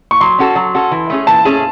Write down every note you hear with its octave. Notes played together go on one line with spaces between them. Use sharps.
C#6
F#3 C6
C#4 F#4 A4
F#3
C#4 F#4 A4
E3
A3 C#4 G#4
E3 A5
A3 C#4 G#4